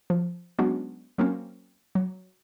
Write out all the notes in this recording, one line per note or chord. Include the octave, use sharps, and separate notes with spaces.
F3
F#3 G#3 B3 C#4 D4 F#4
F#3 A#3 C4 C#4
F#3